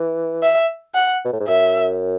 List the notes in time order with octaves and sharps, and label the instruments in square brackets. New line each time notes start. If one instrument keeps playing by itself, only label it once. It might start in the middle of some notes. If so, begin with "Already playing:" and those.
Already playing: [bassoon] E3
[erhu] E5
F#5
[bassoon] B2
A2
G#2
[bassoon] F#2 [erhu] E5